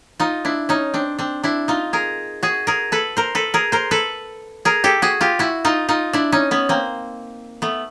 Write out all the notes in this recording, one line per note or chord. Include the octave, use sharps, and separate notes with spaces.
D#4 F4
D4 E4
C#4 D#4
C4 D4
C4 D4
D4 E4
D#4 F4
G#4 A#4
F#4 G#4
G#4 A#4
A4 B4
A#4 C5
A4 B4
G#4 A#4
A#4 C5
A4 B4
G#4 A#4
G4 A4
F#4 G#4
F4 G4
E4 F#4
D#4 F4
D#4 F4
D4 E4
C#4 D#4
B3 C#4
A#3 C4
A3 B3